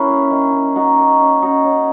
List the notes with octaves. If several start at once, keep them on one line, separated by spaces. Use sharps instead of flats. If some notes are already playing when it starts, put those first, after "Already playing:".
Already playing: E3 C#4 E4 F#4 G#4 A#4
A#3
D#3
D#3
A#3 D#4 F#4
A#3
C#4
C#4 D#4 F#4
C#4